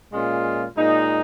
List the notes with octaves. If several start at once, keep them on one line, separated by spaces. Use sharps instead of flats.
A#2 G#3 C#4 F4
A#2 G#3 D#4